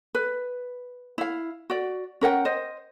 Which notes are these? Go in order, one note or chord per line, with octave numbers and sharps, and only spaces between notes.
B4
E4 F5
F#4 D5
C#4 A#4 F#5 G5
C5 D#5